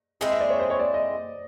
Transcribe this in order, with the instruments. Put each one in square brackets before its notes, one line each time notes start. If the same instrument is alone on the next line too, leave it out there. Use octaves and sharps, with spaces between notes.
[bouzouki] G#3 C4 E4 G#4 [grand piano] D#5
[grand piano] E5
D5
C#5
C5
C#5
D5
D#5